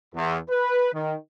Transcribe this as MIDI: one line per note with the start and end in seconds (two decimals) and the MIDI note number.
0.15 0.37 40
0.50 0.89 71
0.93 1.14 51